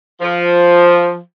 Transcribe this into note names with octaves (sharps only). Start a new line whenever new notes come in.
F3